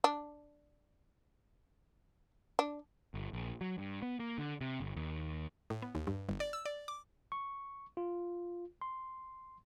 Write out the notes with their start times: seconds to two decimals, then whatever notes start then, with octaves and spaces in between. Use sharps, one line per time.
0.04 D4
2.59 D4
3.14 G1
3.33 A#1
3.61 F#3
3.78 G2
4.02 B3
4.20 A#3
4.38 D3
4.61 C3
4.80 G1
4.96 D#2
5.70 A2
5.82 B3
5.95 D#2
6.07 G2
6.29 G1
6.40 D5
6.53 E6
6.65 D5
6.88 D6
7.32 C#6
7.97 F4
8.81 C6